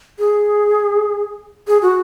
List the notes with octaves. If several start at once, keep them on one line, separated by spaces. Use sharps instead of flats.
G#4
G#4
F#4